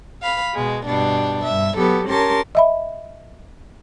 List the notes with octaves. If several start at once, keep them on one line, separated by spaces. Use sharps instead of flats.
F5 B5
B2 G#3
G2 B2 D4 G4
G2 E5
F#3 B3 G4 A4
C#4 G4 A#4 A5 C6
D#5 E5 B5